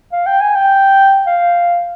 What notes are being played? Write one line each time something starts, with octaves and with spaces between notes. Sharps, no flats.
F5
G5
G#5
G5
F5